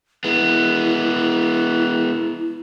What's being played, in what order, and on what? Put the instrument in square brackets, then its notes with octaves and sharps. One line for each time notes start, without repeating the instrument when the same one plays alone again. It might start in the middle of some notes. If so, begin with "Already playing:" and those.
[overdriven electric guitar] G#3 B3 [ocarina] E4